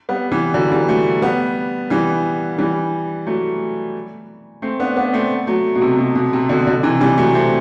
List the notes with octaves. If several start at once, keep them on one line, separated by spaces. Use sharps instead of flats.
G3 B3
E3 G3
D3 F#3
E3 G3
F#3 A3
G3 B3
E3 G3
E3 G3
F#3 A3
A3 C4
B3 D4
B3 D4
A3 C4
F#3 A3
B2
C3
B2
B2
C3
B2 D3
B2 D3
C3 E3
E3 G3
F#3 A3
A3 C4